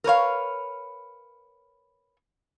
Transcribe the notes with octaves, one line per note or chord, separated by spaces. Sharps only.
A#4 B4 C#5 F5